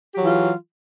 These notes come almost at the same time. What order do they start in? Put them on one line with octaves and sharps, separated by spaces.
G4 F#3 E3 F4